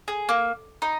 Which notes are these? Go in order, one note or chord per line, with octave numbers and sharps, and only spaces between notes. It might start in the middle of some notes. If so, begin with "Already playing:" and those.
G#4
A#3
D#4